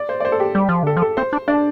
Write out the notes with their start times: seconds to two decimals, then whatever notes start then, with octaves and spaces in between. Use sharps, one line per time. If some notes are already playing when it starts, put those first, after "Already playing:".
Already playing: D5
0.09 C5
0.20 D5
0.25 C5
0.32 A4
0.40 G4
0.55 G3
0.69 F3
0.83 D3 A4
0.97 F3
1.02 A4
1.17 C4 C5
1.33 D4
1.48 D4 D5